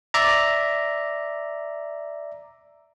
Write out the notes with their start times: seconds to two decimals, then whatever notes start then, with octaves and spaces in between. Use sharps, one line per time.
0.14 D5 E5 A#5